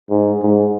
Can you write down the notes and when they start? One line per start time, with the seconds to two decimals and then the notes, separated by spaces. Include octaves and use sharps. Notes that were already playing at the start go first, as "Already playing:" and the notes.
0.10 G#2
0.42 G#2